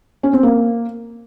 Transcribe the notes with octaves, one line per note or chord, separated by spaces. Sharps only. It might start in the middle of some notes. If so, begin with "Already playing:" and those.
C#4
C4
A#3